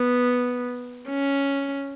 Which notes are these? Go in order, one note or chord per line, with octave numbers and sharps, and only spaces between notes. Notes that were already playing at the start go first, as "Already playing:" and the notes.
Already playing: B3
C#4